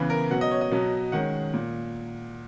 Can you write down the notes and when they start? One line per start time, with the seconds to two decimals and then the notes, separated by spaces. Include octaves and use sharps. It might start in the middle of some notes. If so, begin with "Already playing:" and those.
Already playing: C#3 E3 B3 B4
0.10 A#4
0.31 B2 F#3 C#4 F#5
0.41 D#5
0.51 C#5
0.61 D#5
0.71 B2 F#3 B3
1.12 D#3 G#3 C#4 F#5
1.54 A#2